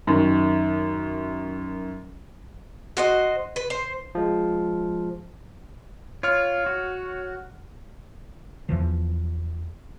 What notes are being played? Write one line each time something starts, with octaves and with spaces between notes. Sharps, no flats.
F#2 D#3
F#4 C5 D#5
B4
C5
F3 G#3
F4 C#5 F6
F#4
E2 E3 F3